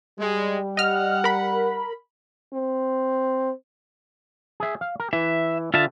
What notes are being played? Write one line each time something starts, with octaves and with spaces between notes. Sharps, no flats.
G3 G#3
D#5 F#5 F6
A#4 B5
C4
G#4 E5
F5
A#4
E3 E5
D3 F4 E5 A5